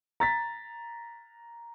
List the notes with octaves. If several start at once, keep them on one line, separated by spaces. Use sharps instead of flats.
A#5 A6 B6